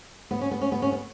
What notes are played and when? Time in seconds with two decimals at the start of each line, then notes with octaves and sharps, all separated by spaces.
0.31 B3
0.41 C#4
0.51 B3
0.61 C#4
0.72 B3
0.82 C#4
0.92 B3